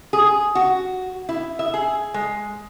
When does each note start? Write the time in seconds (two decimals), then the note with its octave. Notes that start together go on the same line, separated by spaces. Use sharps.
0.13 G#4
0.55 F#4
1.29 E4
1.59 E5
1.74 G#4
2.14 G#3